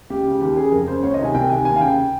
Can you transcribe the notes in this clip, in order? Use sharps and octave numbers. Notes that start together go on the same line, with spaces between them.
C#2 G4
C#3
D#2 G4
C#3 G#4
F2 A#4
C#3 C5
C#2 C#5
D#5
C3 D#3 G#5
C2 G5
C3 D#3 G#5
D#2 G#5
F5
C#3 G5